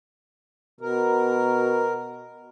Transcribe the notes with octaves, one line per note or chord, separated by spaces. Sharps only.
B2 A#4